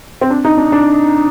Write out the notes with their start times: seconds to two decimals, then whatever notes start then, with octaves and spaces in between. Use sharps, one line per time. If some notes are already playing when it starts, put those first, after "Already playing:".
0.21 C4
0.30 D4
0.45 D#4
0.58 D4
0.72 D4